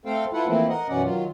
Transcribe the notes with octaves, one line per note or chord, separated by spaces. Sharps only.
A3 C4 A4 C5 F5 G5
E4 F4 A4 B4 F#5
E3 F3 A3 A#3 C4 E4
A#4 D#5 F#5
F#2 B2 E3 C#4 D5 F#5
D#3 F#3 F4